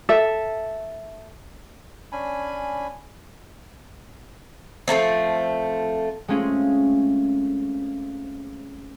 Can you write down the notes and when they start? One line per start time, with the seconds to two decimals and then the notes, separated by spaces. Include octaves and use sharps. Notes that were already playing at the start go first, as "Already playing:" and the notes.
0.09 A4 E5
2.12 C#4 D4 G#5 B5
4.88 F3 A3 A#3 C4
6.28 G#3 A3 C4 C#4 F4 G#4